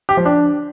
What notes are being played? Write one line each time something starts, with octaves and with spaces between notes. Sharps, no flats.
G4
F3
D4